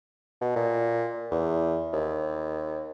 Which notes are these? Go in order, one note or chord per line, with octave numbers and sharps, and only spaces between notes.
B2
A#2
E2
D#2